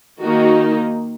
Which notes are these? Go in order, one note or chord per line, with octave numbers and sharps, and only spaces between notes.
D#3 A#3 D#4 F#4